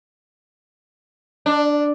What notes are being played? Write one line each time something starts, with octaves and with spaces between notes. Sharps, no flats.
D4